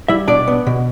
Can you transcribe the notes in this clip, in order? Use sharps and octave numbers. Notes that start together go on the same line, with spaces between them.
G3 E4 E5
B2 D4 D5
B3
B2